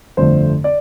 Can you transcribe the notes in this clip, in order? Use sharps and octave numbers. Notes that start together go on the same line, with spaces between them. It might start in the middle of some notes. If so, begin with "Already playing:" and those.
G1 F2 D3 A3 C5
D5